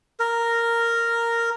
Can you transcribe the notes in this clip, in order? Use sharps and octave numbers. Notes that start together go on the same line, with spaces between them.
A#4